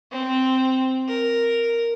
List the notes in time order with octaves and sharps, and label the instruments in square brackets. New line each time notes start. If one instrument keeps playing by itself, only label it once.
[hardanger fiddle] C4
A#4